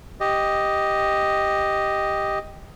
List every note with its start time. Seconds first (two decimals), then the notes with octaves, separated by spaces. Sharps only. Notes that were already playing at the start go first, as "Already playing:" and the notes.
0.20 G4 D#5